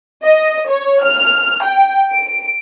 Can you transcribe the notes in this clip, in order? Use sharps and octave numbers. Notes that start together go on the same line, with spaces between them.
D#5
C#5
F6
G5
D7